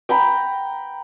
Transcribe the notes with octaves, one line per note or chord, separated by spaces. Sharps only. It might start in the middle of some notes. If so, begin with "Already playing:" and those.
G5 A#5 B5